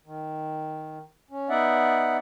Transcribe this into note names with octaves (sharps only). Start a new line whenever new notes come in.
D#3
C#4
B3 D#4 D5 E5 F#5